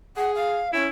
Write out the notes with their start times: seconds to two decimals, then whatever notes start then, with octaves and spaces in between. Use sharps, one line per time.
0.17 G#4 F#5
0.35 F5
0.73 C#4 E4